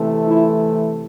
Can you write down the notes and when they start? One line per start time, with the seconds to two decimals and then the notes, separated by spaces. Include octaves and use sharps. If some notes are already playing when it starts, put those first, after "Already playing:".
Already playing: C3 E3 A3
0.26 E4